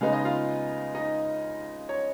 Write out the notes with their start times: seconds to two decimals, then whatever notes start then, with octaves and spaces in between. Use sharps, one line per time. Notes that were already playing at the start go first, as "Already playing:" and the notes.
0.01 C#3 G#3 B3 D#4 F5
0.13 D#5
0.25 F4 F5
0.95 D#4 D#5
1.89 C#5